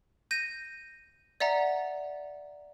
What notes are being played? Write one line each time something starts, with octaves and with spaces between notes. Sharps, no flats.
G6 A#6 D#7
D5 E5 F#5 A#5